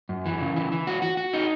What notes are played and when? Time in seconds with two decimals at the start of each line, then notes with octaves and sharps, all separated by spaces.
0.09 F#2
0.26 E3
0.41 C#3
0.56 E3
0.72 E3
0.87 F#4
1.02 F#4
1.17 F#4
1.33 D#4